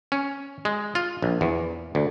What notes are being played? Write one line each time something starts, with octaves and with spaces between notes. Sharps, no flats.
C#4
G#3
F4
A#1
E2
D2